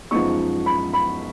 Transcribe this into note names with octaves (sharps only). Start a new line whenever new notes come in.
F#2 F3 G#3 B3 D#4 C#6
B5
B5